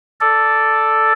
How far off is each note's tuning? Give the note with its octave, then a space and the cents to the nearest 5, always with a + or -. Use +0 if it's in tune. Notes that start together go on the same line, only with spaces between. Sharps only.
A4 +0 D5 +0